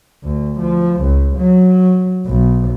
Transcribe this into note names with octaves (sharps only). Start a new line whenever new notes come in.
D2
F3
C#2
F#3
B1